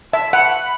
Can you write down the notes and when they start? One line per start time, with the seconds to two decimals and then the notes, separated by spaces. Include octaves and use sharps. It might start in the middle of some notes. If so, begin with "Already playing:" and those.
0.13 E5 A5
0.33 F#5 B5